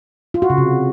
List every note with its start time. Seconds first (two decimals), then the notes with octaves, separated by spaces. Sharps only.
0.34 F4
0.42 F#4
0.50 C#3
0.58 C3